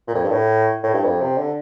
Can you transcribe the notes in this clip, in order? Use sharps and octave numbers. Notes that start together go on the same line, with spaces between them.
A#2
F2
G2
A2
A2
G2
F2
C3
D3